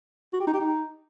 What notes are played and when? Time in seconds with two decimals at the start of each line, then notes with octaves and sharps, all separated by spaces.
0.33 F#4
0.40 G4
0.47 D#4
0.54 G4
0.60 D#4